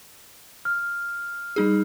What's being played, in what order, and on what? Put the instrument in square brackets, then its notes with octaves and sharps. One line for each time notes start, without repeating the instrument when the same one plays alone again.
[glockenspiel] F6
[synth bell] G3 D#4 G#4